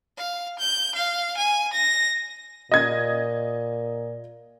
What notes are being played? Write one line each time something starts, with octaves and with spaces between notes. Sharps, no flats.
F5
G6
F5
G#5
A#6
A#2 D#5 G#6